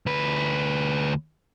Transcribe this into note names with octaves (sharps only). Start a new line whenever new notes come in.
D2 B4